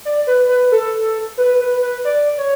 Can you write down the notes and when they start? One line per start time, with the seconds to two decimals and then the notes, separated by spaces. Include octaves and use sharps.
0.05 D5
0.27 B4
0.49 B4
0.72 A4
1.38 B4
1.60 B4
1.82 B4
2.05 D5
2.38 C#5